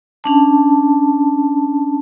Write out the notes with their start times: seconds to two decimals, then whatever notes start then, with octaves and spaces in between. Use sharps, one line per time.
0.24 C#4 D4 A5